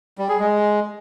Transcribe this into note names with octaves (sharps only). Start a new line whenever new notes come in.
G3
G#4
G#3